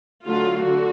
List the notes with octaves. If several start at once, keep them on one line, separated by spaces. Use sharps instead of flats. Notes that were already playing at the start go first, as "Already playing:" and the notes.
D3 F#3 A3 F4
D3 F#4